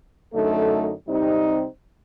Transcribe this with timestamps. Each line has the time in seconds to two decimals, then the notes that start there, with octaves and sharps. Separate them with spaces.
0.33 F#2 D3 A3 D#4 A4
1.07 C3 G3 C4 D#4